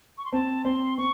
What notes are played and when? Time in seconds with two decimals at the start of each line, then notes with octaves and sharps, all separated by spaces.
0.18 C#6
0.25 C6
0.33 C4 A5
0.65 C4 C6
0.98 C4 C#6